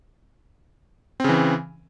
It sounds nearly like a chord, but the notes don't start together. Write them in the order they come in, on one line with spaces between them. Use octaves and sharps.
C4 C#3 E3